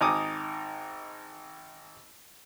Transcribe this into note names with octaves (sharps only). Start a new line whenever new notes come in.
G#1 D#4 G#5 D6 D#6